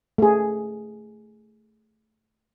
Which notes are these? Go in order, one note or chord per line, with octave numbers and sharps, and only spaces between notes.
A3 G#4